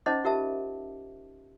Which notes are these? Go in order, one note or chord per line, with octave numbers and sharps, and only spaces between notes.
C#4 D#4 C5 D#5 F#5 D6
F4 G4 A#4 E5 A5